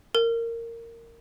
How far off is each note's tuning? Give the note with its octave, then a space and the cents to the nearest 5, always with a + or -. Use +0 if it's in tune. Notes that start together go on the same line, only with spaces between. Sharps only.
A#4 -15